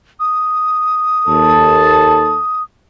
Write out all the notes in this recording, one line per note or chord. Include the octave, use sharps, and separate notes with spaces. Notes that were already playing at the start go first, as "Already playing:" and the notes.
D#6
D#2 A4 A5